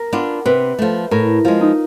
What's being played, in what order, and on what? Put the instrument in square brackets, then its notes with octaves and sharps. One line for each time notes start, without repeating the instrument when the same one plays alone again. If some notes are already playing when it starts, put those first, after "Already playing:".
Already playing: [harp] A#4
[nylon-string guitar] B3 D4 F4
[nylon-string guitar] C3 [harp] B4
[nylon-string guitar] F3 A3
[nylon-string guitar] A2 [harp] A#4
[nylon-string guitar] F3 G#3 [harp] F4
[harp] D#4